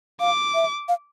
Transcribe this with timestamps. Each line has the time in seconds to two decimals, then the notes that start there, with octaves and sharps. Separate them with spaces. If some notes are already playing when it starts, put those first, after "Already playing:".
0.20 F5 D6
0.55 E5
0.89 F5